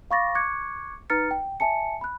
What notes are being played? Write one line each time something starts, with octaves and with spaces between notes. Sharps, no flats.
F5 B5 C#6 D6 A6 A#6
C#6 D6 F#6 G#6 C#7
D#4 B4 A#5 F6 A6 C#7
G5
E5 G#5 A5 C#7
B5 F#6